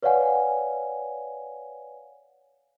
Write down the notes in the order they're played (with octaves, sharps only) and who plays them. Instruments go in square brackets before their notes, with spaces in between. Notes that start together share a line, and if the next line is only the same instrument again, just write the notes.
[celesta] B4 C#5 D5 F5 F#5 G#5